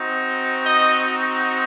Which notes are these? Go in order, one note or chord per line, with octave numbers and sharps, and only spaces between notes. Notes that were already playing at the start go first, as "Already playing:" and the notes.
Already playing: C4 D#4 F#4
D#5